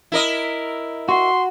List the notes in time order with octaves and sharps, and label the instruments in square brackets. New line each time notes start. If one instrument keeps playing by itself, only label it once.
[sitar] E4 A#4 D#5
[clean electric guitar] F#4 [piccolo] C6